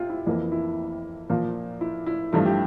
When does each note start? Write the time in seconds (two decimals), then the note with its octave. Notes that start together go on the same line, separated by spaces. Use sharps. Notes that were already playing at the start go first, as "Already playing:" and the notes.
Already playing: C3 F4
0.10 E4
0.26 F2 E3 A#3 E4
0.52 E4
1.29 A#2 F3 A#3
1.81 E4
2.06 E4
2.33 G2 F3 A3 E4
2.45 G4